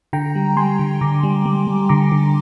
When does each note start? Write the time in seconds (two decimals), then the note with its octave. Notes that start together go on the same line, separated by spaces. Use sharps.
0.13 D3 G5 A#5
0.35 G3
0.57 G3 G#5 C6
0.79 D3
1.01 D3 A#5 D6
1.23 G3
1.45 G3
1.67 G3
1.89 D3 A#5 D6
2.12 D3